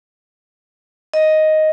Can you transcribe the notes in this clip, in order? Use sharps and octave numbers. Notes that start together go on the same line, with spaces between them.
D#5